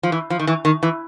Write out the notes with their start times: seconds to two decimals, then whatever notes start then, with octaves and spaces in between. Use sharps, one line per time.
0.03 F3
0.12 E3
0.30 F3
0.40 D#3
0.47 E3
0.65 D#3
0.83 E3